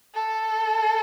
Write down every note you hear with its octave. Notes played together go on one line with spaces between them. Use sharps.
A4